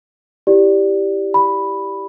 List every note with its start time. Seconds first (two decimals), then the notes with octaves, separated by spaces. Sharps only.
0.47 E4 G4 D5
1.34 B5